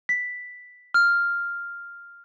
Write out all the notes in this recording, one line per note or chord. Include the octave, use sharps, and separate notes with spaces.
B6
F6